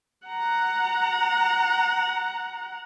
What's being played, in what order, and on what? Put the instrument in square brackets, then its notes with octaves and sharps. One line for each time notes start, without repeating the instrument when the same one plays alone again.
[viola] F#5 A#5